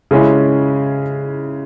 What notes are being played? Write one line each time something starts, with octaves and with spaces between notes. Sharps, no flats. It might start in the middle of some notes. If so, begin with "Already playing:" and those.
C#3 G#3 C#4 E4